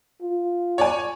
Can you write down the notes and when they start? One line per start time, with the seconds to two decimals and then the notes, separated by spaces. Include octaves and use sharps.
0.22 F4
0.78 C#5 D5 G#5